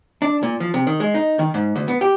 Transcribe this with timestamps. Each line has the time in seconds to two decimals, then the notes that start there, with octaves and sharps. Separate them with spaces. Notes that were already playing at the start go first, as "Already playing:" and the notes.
0.22 D4
0.43 A#2
0.60 F3
0.74 C3
0.87 D#3
1.00 G#3
1.14 D#4
1.39 D#3
1.54 G#2
1.75 D2
1.88 B3
2.01 G4